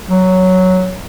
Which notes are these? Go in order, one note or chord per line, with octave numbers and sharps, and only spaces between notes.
F#3